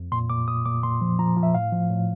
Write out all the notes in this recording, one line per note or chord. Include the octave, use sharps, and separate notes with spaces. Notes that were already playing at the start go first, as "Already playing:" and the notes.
Already playing: F2
A#2 C6
A#2 D6
A#2 D#6
A#2 D6
A#2 C6
F3
F3 A#5
F3
E5
A2 F5
F3
A2